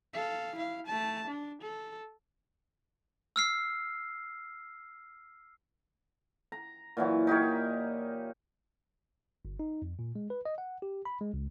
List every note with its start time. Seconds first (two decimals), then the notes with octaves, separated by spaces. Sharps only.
0.14 A4 F5
0.55 E4 F5
0.86 A3 A5
1.27 D4
1.62 A4
3.36 E6 F6 C7
6.52 A#5
6.97 A#2 E3 F#3
7.27 D#4 G4 A#4 C#5
9.45 G1
9.59 D#4
9.82 F2
9.99 A#2
10.15 G#3
10.30 B4
10.45 D#5
10.58 F#5
10.82 G4
11.05 B5
11.21 G#3
11.34 C#2